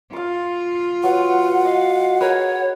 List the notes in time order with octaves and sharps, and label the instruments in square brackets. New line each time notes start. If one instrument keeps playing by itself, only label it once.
[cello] F4 [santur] F5 D6
[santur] F#3 [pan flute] B4 [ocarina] F#5
[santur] D#5 [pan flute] F5
[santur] G#4 A#4 B4 [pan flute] C#5